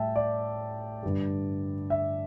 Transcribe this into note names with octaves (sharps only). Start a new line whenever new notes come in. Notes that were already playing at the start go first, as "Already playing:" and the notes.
Already playing: A2 G3 E5 G5 A5
D5
G2 D3 G3
E5